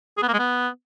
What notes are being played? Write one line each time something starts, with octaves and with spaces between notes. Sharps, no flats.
G#4
B3
A#3
G#3
B3